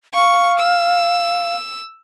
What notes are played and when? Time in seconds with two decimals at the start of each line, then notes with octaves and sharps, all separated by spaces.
0.14 F5 C#6
0.59 E6